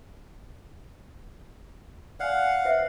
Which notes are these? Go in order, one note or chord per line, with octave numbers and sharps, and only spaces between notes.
D5 F5 F#5 G#5
B4 C5 E5